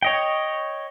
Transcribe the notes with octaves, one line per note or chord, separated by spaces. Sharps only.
C#5 D#5 G5